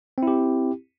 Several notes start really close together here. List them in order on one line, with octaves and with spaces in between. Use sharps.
C4 E4 G4